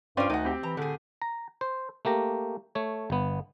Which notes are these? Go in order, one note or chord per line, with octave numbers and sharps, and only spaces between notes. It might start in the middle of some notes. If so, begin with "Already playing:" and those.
G2 C#4 F4 C5 D5 G5
D2 D#3 D#4 F#5
C4 G4
E3 A#5
A2 D3 G#4
A#5
C5
A3 A#3 G4 A#5
A3 C#5
G1 B3